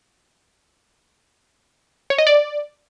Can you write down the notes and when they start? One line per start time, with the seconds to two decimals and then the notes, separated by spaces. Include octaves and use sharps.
2.10 C#5
2.18 D#5
2.27 D5